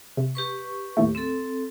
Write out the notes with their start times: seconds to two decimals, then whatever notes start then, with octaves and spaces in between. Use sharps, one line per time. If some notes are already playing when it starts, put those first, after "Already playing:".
0.17 C3
0.35 G4 B4 C#6
0.97 D#2 A2 A3
1.15 C4 A4